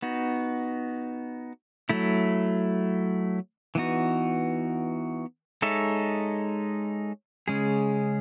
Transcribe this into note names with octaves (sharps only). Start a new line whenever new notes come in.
B3 D#4 F#4
F#3 A3 E4
E3 B3 D#4 F#4
G#3 D#4 A4 C#5 E5
C#3 G#3 C#4 G#4